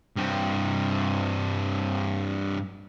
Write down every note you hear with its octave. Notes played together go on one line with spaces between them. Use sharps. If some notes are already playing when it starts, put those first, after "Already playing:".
G2 C4